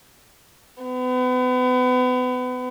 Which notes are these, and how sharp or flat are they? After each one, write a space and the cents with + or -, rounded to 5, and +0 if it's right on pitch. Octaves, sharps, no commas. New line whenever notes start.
B3 +35